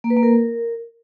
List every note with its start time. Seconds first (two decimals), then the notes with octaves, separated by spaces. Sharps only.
0.04 A#3
0.10 B4
0.17 A#3
0.23 A#4